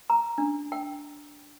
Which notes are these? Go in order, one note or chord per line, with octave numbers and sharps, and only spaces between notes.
A#5
D4
G5